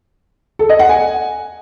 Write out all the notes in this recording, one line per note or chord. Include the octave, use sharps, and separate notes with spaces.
A4
D#5
F#5
G#5